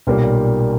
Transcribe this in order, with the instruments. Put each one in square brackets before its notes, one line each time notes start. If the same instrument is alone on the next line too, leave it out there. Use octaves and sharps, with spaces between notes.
[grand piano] B1 A#2 G3 A#3